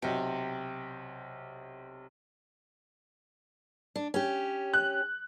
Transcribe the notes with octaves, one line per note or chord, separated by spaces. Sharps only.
B1 C3 G5
D4
C#4 G4
F#6